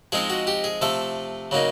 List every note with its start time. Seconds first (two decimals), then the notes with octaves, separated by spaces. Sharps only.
0.12 F3 G#3 C4 D#4 G#4
0.30 F#4
0.47 G4
0.64 G#4
0.81 C3 F3 A3 A4
1.51 C#3 F#3 A#3 D#4